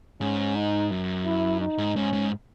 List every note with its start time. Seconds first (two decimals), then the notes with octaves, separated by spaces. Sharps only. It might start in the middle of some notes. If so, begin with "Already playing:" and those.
0.21 G#2 C#4
0.56 D#4
0.91 F#2
1.26 E4
1.61 D#4
1.78 G#2
1.96 G#2 C#4
2.13 G#2